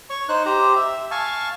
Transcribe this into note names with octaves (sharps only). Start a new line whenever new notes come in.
C#5 C#6
D#4 C5 F#6
G4 C5 A#5
E5
F5 G#5 A5 C#6